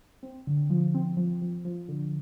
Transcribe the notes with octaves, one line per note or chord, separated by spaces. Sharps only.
C4
D3
F3
C4
F3
F3
F3
D3